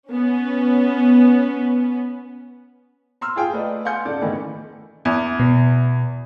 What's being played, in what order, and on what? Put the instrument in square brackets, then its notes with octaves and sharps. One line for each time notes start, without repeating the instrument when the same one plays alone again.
[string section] B3 C#4
[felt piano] A#5 C6 E6 F6
F4 G#4 G5
A3 B4 D5 D#5
F5 F#5 G#5 C6 G6 C#7
C#3 A4 D5
D#3 E3 A3 B3
[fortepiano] E2
[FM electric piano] B2